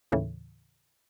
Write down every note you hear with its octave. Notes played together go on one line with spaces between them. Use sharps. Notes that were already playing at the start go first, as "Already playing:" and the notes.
D#2 A2 C#3 E3